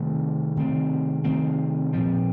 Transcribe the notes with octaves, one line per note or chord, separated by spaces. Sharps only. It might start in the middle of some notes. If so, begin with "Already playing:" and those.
Already playing: C3 D#3 A3 C4
C3 D#3 A3 C4
C3 D#3 A3 C4
A#2 F3 C4